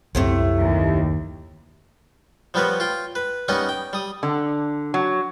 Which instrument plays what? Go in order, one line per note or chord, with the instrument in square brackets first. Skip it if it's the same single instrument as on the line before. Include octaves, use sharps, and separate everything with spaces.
[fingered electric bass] C2 F#2 C4 [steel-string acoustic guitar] A2 C3 A3
[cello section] D#2
[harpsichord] F3 G3 B3 A#4 B4 C#5
F4 G5
B4
G3 B3 C#4 D#4 A#4 D#5
G5
G3 D#6
[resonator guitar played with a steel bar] D3
F#3